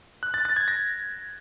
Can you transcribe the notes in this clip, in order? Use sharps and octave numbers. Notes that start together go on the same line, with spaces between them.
F#6
A6
A6
G#6
A#6